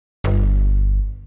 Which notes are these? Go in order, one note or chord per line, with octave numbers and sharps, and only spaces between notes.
G1